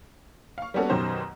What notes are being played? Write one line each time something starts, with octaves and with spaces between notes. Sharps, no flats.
F5 C#6
G3 A#3 B3 C#4 F#4 A4
F#2 B2 D#3 G4 C5